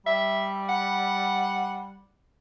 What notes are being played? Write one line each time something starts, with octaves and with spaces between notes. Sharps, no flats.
G3 E5
F#5